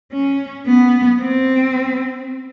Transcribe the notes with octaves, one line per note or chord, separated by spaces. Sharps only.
C#4
B3
C4